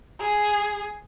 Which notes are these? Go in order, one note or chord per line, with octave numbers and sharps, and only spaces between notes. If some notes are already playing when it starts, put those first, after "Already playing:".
G#4